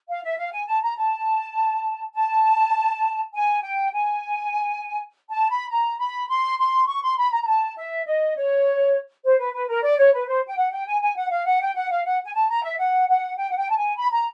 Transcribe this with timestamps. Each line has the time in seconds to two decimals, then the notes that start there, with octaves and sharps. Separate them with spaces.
0.09 F5
0.23 E5
0.38 F5
0.52 G#5
0.67 A5
0.82 A#5
0.97 A5
2.15 A5
3.33 G#5
3.62 G5
3.93 G#5
5.30 A5
5.50 B5
5.70 A#5
5.99 B5
6.29 C6
6.59 C6
6.87 C#6
7.03 C6
7.17 B5
7.32 A#5
7.43 A#5
7.46 A5
7.77 E5
8.07 D#5
8.36 C#5
9.25 C5
9.39 B4
9.53 B4
9.68 A#4
9.83 D5
9.98 C#5
10.13 B4
10.27 C5
10.46 G5
10.57 F#5
10.72 G5
10.86 G#5
11.02 G#5
11.16 F#5
11.31 F5
11.45 F#5
11.61 G5
11.75 F#5
11.90 F5
12.05 F#5
12.24 G#5
12.34 A5
12.49 A#5
12.63 E5
12.79 F#5
13.08 F#5
13.38 G5
13.51 F#5
13.57 G5
13.70 A5
13.77 G#5
13.96 B5
14.12 A#5